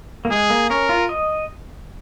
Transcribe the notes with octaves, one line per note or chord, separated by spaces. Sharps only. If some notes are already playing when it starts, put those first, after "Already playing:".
A#3
G#3 G#4
A#3
C#4 A#4
F4
D#5